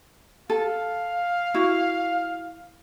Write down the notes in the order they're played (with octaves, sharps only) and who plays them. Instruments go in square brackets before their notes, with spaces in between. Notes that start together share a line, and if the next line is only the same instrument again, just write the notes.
[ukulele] A4 [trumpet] F5
[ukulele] E4 F#4